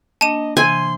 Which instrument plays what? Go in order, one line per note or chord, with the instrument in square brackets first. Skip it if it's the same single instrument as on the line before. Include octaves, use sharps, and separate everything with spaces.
[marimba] A#3 D4 [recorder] D#5 [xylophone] A5 D#7
[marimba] C3 E3 [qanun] G#5 [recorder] C6